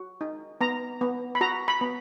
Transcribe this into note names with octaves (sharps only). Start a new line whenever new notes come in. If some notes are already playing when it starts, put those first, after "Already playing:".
Already playing: F#4
D#4
B3 A#5
B3
B5
F#4 A#5
B5
B3